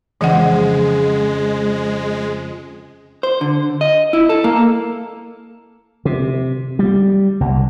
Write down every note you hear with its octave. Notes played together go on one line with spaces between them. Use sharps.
F2 C#3 E3 G#3 D#5 F#5
C5
D3
D#5
E4
A4
A#3
C3
G3
C2